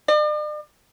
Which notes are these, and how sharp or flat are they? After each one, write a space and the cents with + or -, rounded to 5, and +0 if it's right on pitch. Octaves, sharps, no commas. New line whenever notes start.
D5 +45